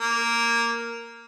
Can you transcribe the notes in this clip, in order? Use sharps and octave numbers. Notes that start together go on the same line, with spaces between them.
A#3